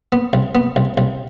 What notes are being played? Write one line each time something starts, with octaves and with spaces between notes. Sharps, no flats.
B3
C2
B3
C2
C2